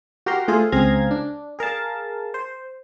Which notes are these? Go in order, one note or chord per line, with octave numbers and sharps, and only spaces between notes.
F#4 G4 A#4 A#5 C6
A3 F4 G#4 A4 C5 F5
C#2 C4 G#4 F5 A#5 G#6
D4
G#4 A#4 F5 A5
C5